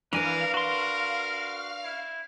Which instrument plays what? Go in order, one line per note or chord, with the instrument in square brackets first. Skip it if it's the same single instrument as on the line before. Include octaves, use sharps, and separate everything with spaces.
[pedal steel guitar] E3 G#5 [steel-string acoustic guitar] D4 B4 [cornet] A#4 [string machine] F5 F6
[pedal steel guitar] F#4 C6 [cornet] A#4
[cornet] E4